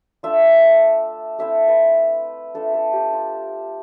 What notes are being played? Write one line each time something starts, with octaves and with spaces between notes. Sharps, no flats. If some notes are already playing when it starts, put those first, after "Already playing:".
A3 D4 F4 E5
A3 C4 E4 E5
B4
A3 D4 F4 A4
A4
G4
F4